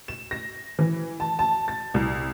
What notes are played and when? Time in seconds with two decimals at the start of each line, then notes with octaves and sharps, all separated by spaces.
0.08 E7
0.31 A#6
0.79 E3
1.20 A5
1.39 A5
1.68 A6
1.94 C2